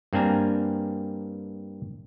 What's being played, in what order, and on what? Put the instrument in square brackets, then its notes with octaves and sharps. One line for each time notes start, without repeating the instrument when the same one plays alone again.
[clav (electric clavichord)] G2 A#3 C4 D4 G#5 A#5